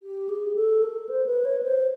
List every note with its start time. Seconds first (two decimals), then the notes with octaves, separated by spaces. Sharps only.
0.03 G4
0.29 G#4
0.56 A4
0.83 A#4
1.09 C5
1.26 B4
1.45 C#5
1.63 C5